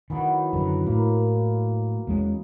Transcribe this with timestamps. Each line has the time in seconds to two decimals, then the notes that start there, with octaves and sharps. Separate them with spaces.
0.10 D#3 E3 F#3 B3
0.53 F#2 D3 D#3 B4 A#5
0.87 A2 A#3
2.07 E2 G#3 C#4